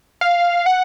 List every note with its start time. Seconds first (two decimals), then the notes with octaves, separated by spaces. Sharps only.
0.21 F5
0.66 F#5